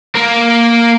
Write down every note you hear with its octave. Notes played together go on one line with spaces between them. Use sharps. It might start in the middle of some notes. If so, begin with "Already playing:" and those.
A#3